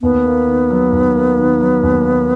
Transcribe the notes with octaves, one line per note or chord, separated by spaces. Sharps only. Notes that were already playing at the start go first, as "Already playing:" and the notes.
D#2 B3
A#3
D#3
F#3
D#2
A#3
D#3
F#3
D#2
A#3